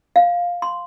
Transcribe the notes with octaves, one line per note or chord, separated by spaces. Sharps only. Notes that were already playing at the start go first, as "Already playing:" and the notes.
F5
C6